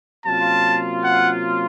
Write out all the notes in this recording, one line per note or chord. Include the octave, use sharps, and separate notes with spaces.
C3 F#3 A#3 C#4 F4 A5
F#5